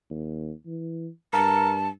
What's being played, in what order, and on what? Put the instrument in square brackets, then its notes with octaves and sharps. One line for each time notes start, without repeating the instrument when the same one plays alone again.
[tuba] D#2
E3
[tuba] G2 [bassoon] A#4 [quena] A5